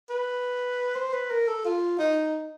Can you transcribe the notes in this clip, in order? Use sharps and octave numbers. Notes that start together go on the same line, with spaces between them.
B4
C5
B4
A#4
A4
F4
D#4